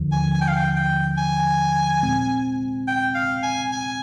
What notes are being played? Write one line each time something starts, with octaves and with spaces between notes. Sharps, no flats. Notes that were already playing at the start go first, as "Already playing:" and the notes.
Already playing: D#2 D3 F3
G#5
G#5
G5
F5
G5
G5
G#5
A#2 G#3 C4
G5
F5
G#5
G#5